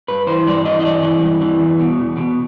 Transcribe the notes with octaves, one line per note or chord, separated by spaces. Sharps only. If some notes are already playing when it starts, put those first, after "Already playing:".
G2 B4
E3 C5
G2 D5
E3 D#5
D#5
G2 D5
E3
G2
E3
E2
B2
E2
B2